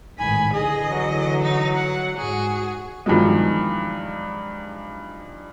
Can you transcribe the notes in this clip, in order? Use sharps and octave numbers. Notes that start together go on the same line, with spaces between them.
A1 G#2 D#3 G#5 B5
C2 D3 E3 G#4 D#5
F#3
D#4
F#5
G#2 F#4 G#4
E2 G2 D#3 F3 F#3 G#3